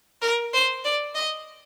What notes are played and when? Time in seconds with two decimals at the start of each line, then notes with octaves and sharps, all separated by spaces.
0.22 A#4
0.53 C5
0.84 D5
1.15 D#5